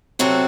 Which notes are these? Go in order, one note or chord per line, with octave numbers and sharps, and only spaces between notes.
C3 F#3 C4 F#4 A4